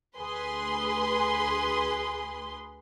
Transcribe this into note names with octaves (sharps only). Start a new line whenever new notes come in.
D2 G#4 B4 C6